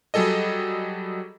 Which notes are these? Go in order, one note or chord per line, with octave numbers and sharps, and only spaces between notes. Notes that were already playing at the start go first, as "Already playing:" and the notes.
F#3 G3 G#4 A4 D#5